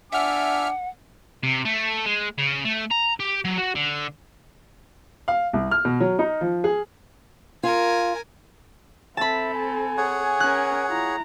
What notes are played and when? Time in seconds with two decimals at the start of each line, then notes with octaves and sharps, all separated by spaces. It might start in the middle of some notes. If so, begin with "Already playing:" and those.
0.12 D4 E5 F#5 G#5 D6 F6
1.43 C3
1.65 A3
2.06 G#3
2.38 C#3
2.65 A3
2.91 A#5
3.20 G4
3.45 F#3
3.58 F#4
3.75 D3
5.28 F5
5.53 C2
5.71 F6
5.85 B2
6.00 F#3
6.19 D#4
6.41 F3
6.64 G#4
7.63 F4 A#4 G#5
9.17 C4 A4 E5 A5 B5
9.54 G#5
9.97 G#4 C#5 F#5
10.40 C#4 A#4 F#6
10.89 E4 F4 A#5